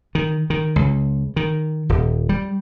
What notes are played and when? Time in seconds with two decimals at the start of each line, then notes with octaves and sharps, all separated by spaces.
0.15 D#3
0.50 D#3
0.76 C#2
1.36 D#3
1.89 D#1
2.29 G3